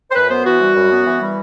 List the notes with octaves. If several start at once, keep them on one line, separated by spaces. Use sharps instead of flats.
C5
F#2 B4
B3 C5
E3 F#4
G3
F#2
B3
E3
G3